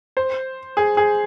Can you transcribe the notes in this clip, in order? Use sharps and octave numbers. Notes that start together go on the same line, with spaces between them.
C5
G#4
G#4